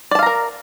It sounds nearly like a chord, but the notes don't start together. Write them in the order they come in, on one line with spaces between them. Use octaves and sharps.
D5 A5 F5 A#5 A#4